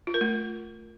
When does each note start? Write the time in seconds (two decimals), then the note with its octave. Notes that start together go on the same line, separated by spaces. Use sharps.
0.07 F4
0.14 A#4
0.21 A3